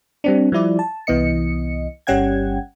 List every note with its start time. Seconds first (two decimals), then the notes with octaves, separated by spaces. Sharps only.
0.24 G3 C4 D4
0.52 F3 G3 E4 D5
0.79 A5
1.07 C2 E3 B3 D#5 C#7
2.07 G1 G3 C#4 F#5 G5 G#6